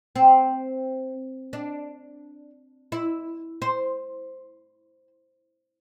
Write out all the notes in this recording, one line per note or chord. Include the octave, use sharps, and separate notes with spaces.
C4
D4
E4
C5